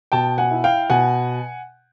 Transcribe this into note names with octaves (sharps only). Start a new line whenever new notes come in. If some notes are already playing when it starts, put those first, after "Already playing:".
B2 G5 A5
F#5 G#5
E4
F5 G5
B2 F#5 G#5